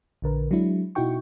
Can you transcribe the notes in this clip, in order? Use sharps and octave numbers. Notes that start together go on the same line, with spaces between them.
A#1 D3 A#4 B4
F#3 G#3 D4 E4
B2 D#4 E4 F#4 G5 C#6